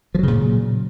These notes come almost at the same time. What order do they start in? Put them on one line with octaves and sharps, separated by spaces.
F3 F#3 C#3 A#2